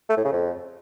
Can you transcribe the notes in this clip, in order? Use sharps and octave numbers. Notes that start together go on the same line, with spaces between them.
A3
A2
C#3
F2